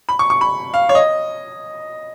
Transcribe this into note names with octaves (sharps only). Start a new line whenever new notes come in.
B5
C#6
C#6
B5
F5
C#5
D#5